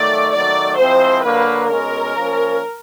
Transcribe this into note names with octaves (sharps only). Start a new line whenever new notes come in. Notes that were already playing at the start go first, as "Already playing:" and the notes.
Already playing: D#3 F#3 A3 D5
D#3 F#3 A3 D5
F3 G#3 C4 E4 C5
D3 F#3 A#3 B4
B2 G#3 C#4 A#4
F3 A#3 C#4